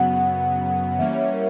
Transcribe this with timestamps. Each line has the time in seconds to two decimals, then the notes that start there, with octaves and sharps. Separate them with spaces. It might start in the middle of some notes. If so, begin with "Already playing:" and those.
Already playing: F#2 C#3 F#3 B3 F#5
0.99 E3 G3 A#3 C#4 E5
1.13 C#5
1.33 A#4